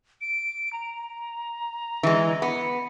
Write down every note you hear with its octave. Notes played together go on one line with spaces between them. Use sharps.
D7
A#5
E3 G#3
B3 C#7